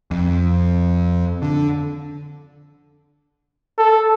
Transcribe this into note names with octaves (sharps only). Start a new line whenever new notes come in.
F2
D3
A4